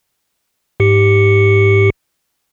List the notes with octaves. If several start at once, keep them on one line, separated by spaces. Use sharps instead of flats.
G#2 G4 C#7